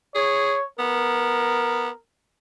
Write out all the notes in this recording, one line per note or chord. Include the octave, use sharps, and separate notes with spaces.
G#4 C#5
B3 A#4